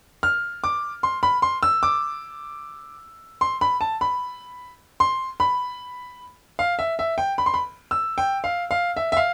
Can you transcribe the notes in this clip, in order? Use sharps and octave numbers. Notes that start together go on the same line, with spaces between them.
F6
D6
C6
B5
C6
E6
D6
C6
B5
A5
B5
C6
B5
F5
E5
E5
G5
B5
C6
B5
E6
G5
F5
F5
E5
E5
F5